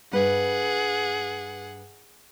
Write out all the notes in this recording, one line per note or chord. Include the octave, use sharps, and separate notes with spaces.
G2 G#4 B4 F#5